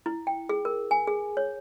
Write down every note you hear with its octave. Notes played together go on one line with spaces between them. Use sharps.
E4
G5
G#4
A#4
G#5
G#4
C#5